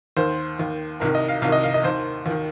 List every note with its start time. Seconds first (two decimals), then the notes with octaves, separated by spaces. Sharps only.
0.17 D#2 D#3 C5
0.59 D#2 D#3
1.00 C2 C3 D#3 A#4
1.15 D#5
1.29 F5
1.42 C2 C3 D#3 F5
1.52 D#5
1.63 F5
1.74 D#5
1.83 D#2 D#3 C5
2.26 D#2 D#3